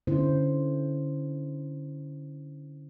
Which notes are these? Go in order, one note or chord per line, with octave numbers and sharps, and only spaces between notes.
D3 C#4 E4 C5